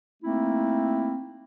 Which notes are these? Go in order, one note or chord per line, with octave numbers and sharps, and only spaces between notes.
A3 A#3 C4 D#4 E4